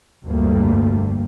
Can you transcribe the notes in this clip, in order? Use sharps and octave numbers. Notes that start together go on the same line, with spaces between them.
F1 D2 G2 G3 A3 A#3